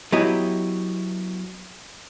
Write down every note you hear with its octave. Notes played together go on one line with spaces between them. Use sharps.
F#3 B3 E4 G4 D#5